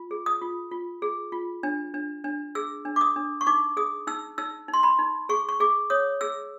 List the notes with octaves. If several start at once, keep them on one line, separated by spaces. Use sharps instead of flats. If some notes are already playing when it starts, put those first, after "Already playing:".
Already playing: F4
G#4
D#6
F4
F4
G#4
F4
D4
D4
D4
G#4 E6
D4
D6
D#6
D4
C#6
D#4 D6
G#4 D#6
D#4 E6
D#4 E6
D#4
C6
B5
D#4
G#4 C#6
C#6
G#4 D6
C#5 D#6
G#4 E6